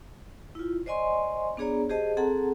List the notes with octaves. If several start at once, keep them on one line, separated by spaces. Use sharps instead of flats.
E4 F4
C5 D5 D#5 G#5 C6 C#6
B3 D4 G#4 C#5 D5 A#5
G4 G#4 C5 D#5 A5
C4 G#4 A4 F#5 A5 A#5